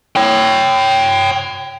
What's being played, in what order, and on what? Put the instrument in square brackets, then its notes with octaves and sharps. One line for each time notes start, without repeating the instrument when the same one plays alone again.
[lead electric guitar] C#5 G5